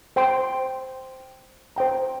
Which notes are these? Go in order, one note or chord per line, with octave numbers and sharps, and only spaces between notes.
C5 G5 C6
C5 G5 A#5